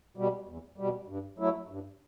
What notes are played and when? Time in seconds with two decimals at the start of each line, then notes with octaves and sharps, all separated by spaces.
0.17 B2 G3
0.47 E2
0.78 B2 G3
1.08 G2
1.38 F#3 A3 E4
1.68 G2